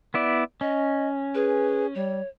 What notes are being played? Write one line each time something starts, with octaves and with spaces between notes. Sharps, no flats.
B3 E4 D5
C#4 D#5
G#4 B4
G3 C#5